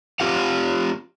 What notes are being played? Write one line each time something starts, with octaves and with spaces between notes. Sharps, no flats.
C4 F4 G4 F5 F#5